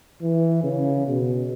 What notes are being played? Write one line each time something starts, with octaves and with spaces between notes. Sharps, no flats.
E3
C#3
B2